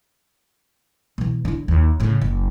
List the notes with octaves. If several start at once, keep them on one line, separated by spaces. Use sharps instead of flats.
B2 E3
D3 E4
D#2
A2 C#3
F#1